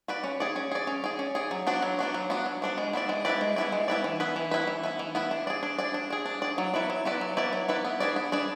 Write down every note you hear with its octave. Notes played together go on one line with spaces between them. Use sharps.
F#4 B4 D5
C#4
G#4 D5
C#4
G#4 D5
C#4
G#4 D5
C#4
G#4 D5
F#3
B3 D4 F#4
F#3
B3 D4 F#4
F#3
B3 D4 F#4
F#3
B3 D4 F#4
G#3
B3 E4 B4 D5
G#3
B3 E4 B4 D5
G#3
B3 E4 B4 D5
G#3
B3 E4 B4 D5
E3
B3 E4 B4
E3
B3 E4 B4
E3
B3 E4 B4
E3
B3 E4 B4
D4
G#4 D5
D4
G#4 D5
D4
G#4 D5
D4
G#4 D5
F#3
B3 E4 B4 D5
F#3
B3 E4 B4 D5
F#3
B3 E4 B4 D5
F#3
B3 E4 B4 D5
B3
D4 G#4 B4 D5
B3
D4 G#4 B4 D5